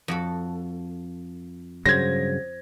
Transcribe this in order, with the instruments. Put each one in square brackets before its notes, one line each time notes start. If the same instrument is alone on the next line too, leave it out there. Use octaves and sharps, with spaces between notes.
[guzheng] F2 F#4 A4
[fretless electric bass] G2 C#3 F#3 [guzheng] C5 [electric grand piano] G#6 A#6